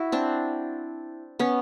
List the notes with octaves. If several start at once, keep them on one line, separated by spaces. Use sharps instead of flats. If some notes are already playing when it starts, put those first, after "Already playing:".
Already playing: E4 F#4
C4 D4
B3 C#4